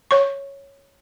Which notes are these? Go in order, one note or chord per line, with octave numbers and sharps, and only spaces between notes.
C#5 C#6